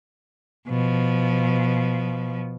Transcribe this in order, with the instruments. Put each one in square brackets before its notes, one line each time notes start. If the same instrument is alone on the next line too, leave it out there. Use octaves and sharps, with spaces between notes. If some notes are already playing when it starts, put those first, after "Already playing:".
[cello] B2 F3